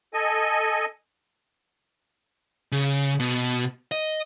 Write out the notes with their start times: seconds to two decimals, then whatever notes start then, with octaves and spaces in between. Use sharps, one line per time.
0.14 A4 D#5 G#5
2.72 C#3
3.20 B2
3.92 D#5